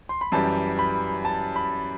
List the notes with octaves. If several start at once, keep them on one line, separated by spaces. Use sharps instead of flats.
C6
B5
F#2 E3 G3 A5
B5
A5
B5